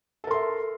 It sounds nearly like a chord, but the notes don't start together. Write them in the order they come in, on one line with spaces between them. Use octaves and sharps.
A4 A#4 C6 E5